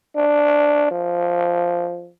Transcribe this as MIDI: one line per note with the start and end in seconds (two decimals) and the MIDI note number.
0.16 0.87 62
0.91 2.10 53